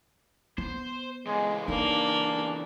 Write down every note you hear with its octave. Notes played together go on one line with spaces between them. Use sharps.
B3 C5
C#3 E3 G#3
A#3 D4 D#4 A#4